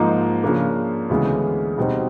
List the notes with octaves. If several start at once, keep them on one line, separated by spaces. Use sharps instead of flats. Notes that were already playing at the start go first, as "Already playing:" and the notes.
Already playing: G#2 F3 A#3 D#4
C#3 F3 A#3 D4
D2 C#3 E3 G#3 B3
B2 G3 C4 D#4